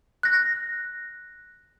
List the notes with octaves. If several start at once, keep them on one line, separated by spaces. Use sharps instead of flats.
F#6 A#6